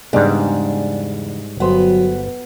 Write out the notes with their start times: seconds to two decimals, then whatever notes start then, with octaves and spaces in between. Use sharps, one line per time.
0.13 E2 G#2 C#3 G3 G#3 D4
1.60 G1 F#3 B3 C5